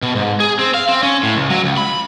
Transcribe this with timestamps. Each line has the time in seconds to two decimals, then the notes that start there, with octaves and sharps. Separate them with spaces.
0.02 B2
0.16 G#2
0.40 G#4
0.59 C4
0.74 F5
0.89 C4
1.03 C#4
1.23 A2
1.35 C#2
1.50 F#3
1.64 C#2
1.77 B5